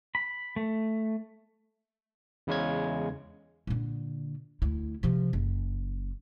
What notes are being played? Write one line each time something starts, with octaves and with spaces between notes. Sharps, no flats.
B5
A3
E2 C#3 G#3 C#4 G#6
A#2 D3
D2 E4
C3 F3
F#1